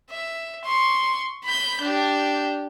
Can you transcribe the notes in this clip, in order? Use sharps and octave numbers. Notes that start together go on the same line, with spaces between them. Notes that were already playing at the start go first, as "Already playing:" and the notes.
E5
C6 C#6
B5 G6
D4 G4